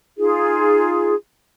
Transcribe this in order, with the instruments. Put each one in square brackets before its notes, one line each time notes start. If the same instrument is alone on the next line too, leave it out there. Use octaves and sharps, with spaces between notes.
[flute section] D#4 F4 G#4